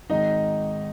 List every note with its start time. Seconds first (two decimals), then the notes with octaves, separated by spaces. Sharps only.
0.10 G#1 G#2 D#3 D#4 D#5